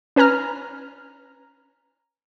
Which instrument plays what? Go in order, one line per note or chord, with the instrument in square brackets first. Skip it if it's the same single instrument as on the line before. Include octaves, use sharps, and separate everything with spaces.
[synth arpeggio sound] C#4 B4 G#5 A#5 F6